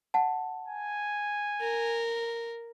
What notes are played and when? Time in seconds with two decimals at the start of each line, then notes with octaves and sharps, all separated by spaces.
0.14 F#5 A5
0.68 G#5
1.61 A#4